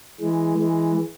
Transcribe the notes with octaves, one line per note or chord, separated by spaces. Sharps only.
E3 G#3
E3 G#3